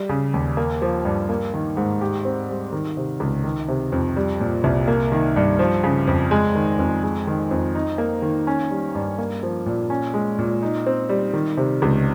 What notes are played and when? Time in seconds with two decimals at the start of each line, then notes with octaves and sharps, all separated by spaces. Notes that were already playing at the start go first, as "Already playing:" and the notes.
Already playing: G3
0.09 C#3
0.34 D#2
0.57 A#3
0.82 F3
1.05 G2
1.29 A#3
1.54 D#3
1.77 G#2
2.01 G4
2.25 C4
2.49 G3
2.73 D#3
2.97 C3
3.20 C#2
3.44 D#3
3.69 C3
3.92 F2
4.16 G3
4.40 A#2
4.64 C2
4.88 A#3
5.12 D#3
5.36 G2
5.59 F3
5.84 C#3
6.07 F2
6.31 G#3
6.55 D#3
6.79 F2
7.03 G#3
7.27 D#3
7.51 F2
7.75 D#4
7.98 A#3
8.22 D#3
8.47 C#4
8.71 G3
8.95 G2
9.19 A#3
9.43 F3
9.66 A#2
9.90 C#4
10.14 G#3
10.39 A#2
10.62 D#4
10.86 C4
11.09 G3
11.34 D#3
11.57 C3
11.82 C#2